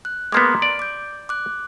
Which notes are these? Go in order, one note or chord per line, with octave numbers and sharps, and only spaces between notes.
F#6
G#3 A#3 B3 A#5 C6 D6
D5
D6 G6
D6 F#6